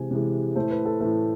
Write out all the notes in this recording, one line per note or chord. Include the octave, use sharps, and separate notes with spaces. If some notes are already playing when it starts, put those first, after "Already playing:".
Already playing: C3 E3 G#3 G#5
C3 E3 G#3
A2 E3 A3 C5
B4
A4
A2 E3 A3 B4